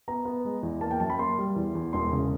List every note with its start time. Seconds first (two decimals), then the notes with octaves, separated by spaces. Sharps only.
0.08 B3 A#5
0.25 B3
0.45 G#3
0.63 E2
0.81 A#3 A5
0.91 G5
1.00 F#2 A5
1.10 B5
1.19 A#3 C6
1.38 G3
1.56 E2
1.75 E2
1.93 E1 C6
2.12 C#3